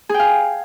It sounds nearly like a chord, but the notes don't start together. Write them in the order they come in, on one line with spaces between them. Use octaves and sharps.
G#4 G5 F5